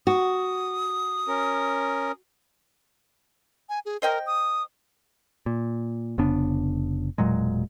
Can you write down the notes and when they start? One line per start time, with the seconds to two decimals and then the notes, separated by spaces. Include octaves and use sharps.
0.07 F#4 D#6
1.28 C#4 A#4
3.69 G#5
3.85 G#4
4.02 A#4 C5 D#5 G5
4.26 D#6
5.46 A#2
6.18 F1 C#3 B3 D4
7.18 E1 A#2 F#3 G#3